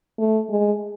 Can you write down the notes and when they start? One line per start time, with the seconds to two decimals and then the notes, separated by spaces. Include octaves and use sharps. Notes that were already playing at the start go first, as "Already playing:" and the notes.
0.19 A3
0.50 G#3